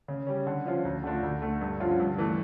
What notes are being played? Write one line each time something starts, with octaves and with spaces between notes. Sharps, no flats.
C#3
G3 C#4
D3
F3 C#4 F4
D2
D3 A3 D4 F4
D2
D3 A3
G2
D3 F3 C#4 F4
G2
E3 A3